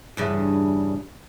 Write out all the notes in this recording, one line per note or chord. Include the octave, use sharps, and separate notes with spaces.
E2 G2 C#3